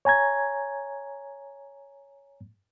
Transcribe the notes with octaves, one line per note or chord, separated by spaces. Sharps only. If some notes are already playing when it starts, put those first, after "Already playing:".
C#5 G#5 A#5 G#6